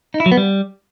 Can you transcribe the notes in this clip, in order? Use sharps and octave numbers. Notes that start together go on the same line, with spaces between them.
D#4
E4
F#3
B3
G3